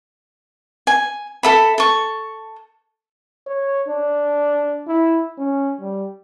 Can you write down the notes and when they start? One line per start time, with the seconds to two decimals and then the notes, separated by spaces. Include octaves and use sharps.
0.87 G#5
1.43 A4 E5 B5
1.78 A4 C#6
3.47 C#5
3.89 D4
4.88 E4
5.39 C#4
5.81 G3